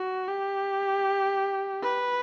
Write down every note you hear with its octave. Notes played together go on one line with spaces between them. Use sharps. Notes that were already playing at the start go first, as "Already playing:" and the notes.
Already playing: F#4
G4
B4